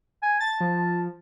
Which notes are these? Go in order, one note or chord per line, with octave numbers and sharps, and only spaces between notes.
G#5
A5 A6
F3